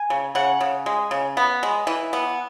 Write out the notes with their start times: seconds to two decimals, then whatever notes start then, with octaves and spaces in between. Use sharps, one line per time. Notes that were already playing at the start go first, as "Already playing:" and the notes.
Already playing: G#5
0.10 C#3
0.35 C#3 F#5
0.61 C#3
0.86 G#3
1.11 C#3
1.37 B3
1.63 G#3
1.87 E3
2.13 B3